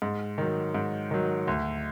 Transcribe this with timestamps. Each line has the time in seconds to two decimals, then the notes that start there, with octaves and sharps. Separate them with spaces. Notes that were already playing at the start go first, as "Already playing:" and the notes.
0.02 G#2
0.38 D#3 F#3
0.74 G#2
1.11 D#3 F#3
1.47 D2